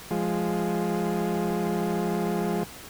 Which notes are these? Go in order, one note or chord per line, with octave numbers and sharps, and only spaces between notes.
F3 G#3